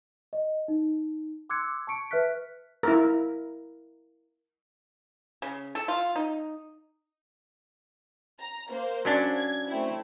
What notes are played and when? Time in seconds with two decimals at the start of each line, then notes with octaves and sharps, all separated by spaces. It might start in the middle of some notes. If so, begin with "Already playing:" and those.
0.33 D#5
0.68 D#4
1.49 C6 D6 E6 F#6 G#6 C#7
1.87 A5 C#6 C#7 D7
2.11 B4 E5 F6 F#6 B6
2.83 E4 A#4
5.42 C#3
5.75 A4
5.88 F4
6.16 D#4
8.39 A#5
8.69 A#3 C5
9.05 F#3 C#4 D4
9.35 G#6
9.68 A3 C4 E4